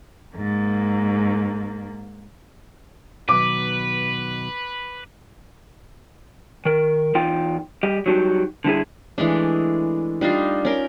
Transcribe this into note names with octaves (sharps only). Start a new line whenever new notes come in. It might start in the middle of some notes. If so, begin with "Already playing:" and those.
G#2 A#3
B2 D#3 F#3 B4 D6
D#3 A#4
E2 D#4 F4 G5
G3 G4 D#5
F#3 G3 D#4 F#4 G4
D3 G3 E4 G#4
E3 G#3 A3 D4
G3 D4 D#4 F4
C#4 A#4 G5